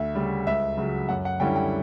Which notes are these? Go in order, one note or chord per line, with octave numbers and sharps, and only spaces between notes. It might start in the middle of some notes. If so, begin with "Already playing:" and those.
Already playing: D2 E5
C#3 G3
C#2 E5
C#3 F#3
F#2 F#5
F#5
D3 G3 C#4 E4 G5
G5